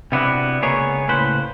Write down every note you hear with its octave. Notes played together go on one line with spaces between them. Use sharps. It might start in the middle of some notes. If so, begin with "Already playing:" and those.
C3 B3 D4 E4 F#4
C#2 A#3 B3 G#4 C#5
A2 C#3 B4 C5